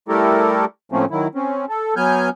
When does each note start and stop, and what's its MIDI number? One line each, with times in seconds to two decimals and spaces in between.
0.08 0.65 55
0.08 0.65 57
0.08 0.65 64
0.08 0.65 67
0.08 0.65 69
0.08 0.65 70
0.92 1.05 45
0.92 1.05 53
0.92 1.05 57
0.92 1.05 58
0.92 1.05 60
0.92 1.05 61
1.11 1.28 51
1.11 1.28 54
1.11 1.28 64
1.35 1.65 60
1.35 1.65 61
1.69 1.94 69
1.96 2.29 54
1.96 2.29 59
1.96 2.29 80
1.96 2.29 89
1.96 2.29 91